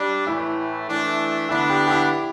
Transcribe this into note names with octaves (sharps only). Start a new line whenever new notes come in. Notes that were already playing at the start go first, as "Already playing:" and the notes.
Already playing: G3 D4
A2 E3 A3 E4
E3 A3 D4
D3 B3 D4 E4
G4
G4
E4